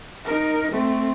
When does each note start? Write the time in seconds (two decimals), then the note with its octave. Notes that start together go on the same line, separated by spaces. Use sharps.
0.25 D#4 A#4
0.72 A3 C4